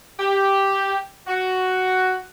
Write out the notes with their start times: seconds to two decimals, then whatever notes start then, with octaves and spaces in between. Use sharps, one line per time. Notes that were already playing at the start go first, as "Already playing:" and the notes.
0.20 G4
1.27 F#4